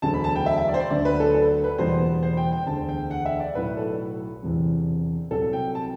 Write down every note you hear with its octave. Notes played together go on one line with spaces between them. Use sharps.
E1 D2 D3 F#3 A5
B5
A5
G5
E5
E5
D5
C5
D5
D2 D3 F#3 D5
B4
A4
A4
B4
F#1 E2 B2 G3 C5
C5
G5
G5
E1 D2 D3 A5
G5
F#5
E5
D5
B1 A2 F#3 B4
A4
E1 E2 C3 E3
C2 C3 F#3 A4
G5
A5